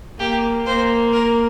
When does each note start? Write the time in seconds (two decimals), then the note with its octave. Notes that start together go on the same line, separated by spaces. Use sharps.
0.19 A#3 G4
0.66 A#3 C5
1.13 A#4